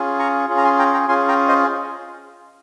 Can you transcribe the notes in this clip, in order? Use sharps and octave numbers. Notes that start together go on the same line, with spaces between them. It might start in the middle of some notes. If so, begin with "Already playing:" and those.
Already playing: C#4 F4 G#4
A#5 C#6
C#4 F4 G#4
A#5
G#5 C6
G5 A#5
G5 A#5
C#4 F4 G#4 G#5 C6
G5 A#5
C5 D#5